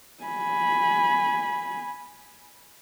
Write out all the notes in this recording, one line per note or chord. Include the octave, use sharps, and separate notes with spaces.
G#5 B5